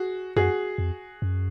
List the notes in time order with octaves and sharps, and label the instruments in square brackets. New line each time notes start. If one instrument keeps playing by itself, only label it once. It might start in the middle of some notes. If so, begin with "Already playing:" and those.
Already playing: [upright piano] F#4 G#4
[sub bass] F#2 [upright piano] F#4 G#4
[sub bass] F2
F#2